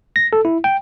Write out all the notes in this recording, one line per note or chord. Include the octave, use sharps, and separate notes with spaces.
A#6
A4
E4
G5